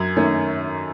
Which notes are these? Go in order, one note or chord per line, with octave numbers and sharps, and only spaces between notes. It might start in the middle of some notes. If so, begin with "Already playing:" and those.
Already playing: F#2 G#6
D#3 A3 C#4